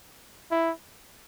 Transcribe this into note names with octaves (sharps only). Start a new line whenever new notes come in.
E4